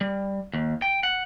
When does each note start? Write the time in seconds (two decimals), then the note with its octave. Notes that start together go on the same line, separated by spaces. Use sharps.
0.01 G3
0.53 D#2
0.82 G5
1.03 F#5